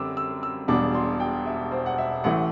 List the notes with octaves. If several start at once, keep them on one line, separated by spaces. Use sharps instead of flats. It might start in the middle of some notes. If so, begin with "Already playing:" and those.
Already playing: F#2 D3 G3 C4 D6 E6
E6
E6
E1 E2 B2 G3 D4 D6
C6
G5
E5
C5
F#5
E5
A1 A2 E3 A3 F#5